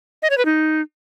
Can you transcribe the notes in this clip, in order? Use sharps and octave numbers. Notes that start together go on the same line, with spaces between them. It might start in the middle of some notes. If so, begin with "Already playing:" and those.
D#5
C#5
B4
D#4